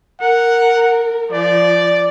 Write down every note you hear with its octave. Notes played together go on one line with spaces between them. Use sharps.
A#4 F#5
F3 D5